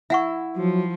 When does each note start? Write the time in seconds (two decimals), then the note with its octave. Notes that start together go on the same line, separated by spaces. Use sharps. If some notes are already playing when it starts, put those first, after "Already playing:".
0.10 E4 E5 F#5 C#6
0.56 F3 F#3